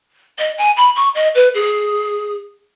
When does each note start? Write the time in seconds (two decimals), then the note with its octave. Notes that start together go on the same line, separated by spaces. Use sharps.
0.39 D#5
0.58 G#5
0.76 B5
0.96 C#6
1.15 D#5
1.35 B4
1.54 G#4